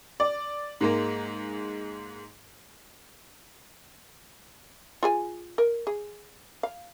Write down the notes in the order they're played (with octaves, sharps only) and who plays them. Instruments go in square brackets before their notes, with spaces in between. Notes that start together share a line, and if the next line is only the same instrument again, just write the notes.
[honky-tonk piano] D5
G#2 G#3 A#3
[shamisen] F4 G#4 G#5
A#4
G#4
F5